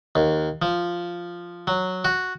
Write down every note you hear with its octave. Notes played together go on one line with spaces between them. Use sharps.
D#2
F3
F#3
F#4